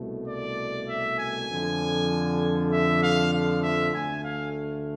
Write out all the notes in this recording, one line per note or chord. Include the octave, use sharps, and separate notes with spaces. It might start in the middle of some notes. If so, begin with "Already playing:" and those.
Already playing: C2 B2 A3
D5
E5
G#5
F2 D3 F3
E5
F5
F5
E5
D2 D3 A3 G#5
F5